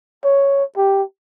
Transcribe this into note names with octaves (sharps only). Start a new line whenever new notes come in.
C#5
G4